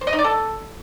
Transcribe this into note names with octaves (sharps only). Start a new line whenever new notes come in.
C5
D#5
D#4
D5
A4